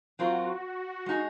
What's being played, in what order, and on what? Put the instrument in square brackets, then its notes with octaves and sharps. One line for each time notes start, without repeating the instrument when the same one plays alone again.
[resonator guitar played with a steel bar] F#3 C4 F4 A#4 [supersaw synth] F#4
[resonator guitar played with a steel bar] G#3 D#4 G#4